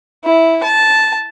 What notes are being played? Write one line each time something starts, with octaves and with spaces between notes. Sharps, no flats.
E4
A5